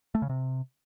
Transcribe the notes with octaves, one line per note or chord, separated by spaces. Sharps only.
A3
C#3
C3